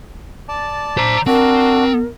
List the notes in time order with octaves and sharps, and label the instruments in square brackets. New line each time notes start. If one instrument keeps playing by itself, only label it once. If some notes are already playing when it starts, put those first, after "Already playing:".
[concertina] D5 A5
[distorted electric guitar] C5 A#5
[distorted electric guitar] C4 [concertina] D4 F#4 [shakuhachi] A#4